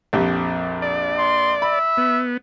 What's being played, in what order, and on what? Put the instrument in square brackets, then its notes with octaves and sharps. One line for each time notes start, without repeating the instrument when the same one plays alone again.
[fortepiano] A#1 F2 G4
[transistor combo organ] D5
[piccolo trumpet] C6
[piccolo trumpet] E5 [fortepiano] B5
[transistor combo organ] B3